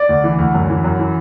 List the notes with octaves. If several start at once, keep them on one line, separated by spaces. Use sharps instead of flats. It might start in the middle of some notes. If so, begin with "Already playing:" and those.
Already playing: D5
D2
E3
D2
F#2
E3
F#2
E3